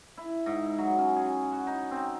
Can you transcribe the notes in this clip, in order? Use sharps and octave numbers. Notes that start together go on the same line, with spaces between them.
E4
G#2
F#3
C#4
G#4
F#4
D#4
C4